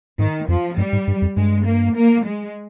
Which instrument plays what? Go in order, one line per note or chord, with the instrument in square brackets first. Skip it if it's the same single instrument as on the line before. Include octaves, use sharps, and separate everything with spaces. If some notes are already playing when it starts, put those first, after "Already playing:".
[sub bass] G#2 [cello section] D#3
[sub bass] F2 [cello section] F3
[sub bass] G2 [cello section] G3
[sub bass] G#2
G2
F2
[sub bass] G2 [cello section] G#3
[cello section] A#3
A#3
G#3